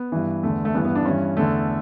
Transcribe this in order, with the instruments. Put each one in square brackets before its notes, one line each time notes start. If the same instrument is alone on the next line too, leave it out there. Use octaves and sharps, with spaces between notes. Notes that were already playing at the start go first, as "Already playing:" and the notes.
Already playing: [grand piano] B3
G2 E3
E2 D3 A3
A3
G2 E3 B3
B3
D4
G2 E3 C#4
E2 D3 A3